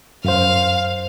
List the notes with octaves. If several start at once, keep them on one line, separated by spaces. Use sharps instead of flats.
F#2 C5 F5